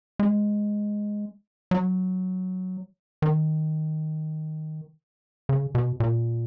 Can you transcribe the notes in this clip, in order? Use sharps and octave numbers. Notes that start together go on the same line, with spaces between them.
G#3
F#3
D#3
C#3
B2
A#2